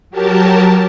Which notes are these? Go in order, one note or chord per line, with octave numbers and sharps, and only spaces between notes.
F#3 G4 A#4 A5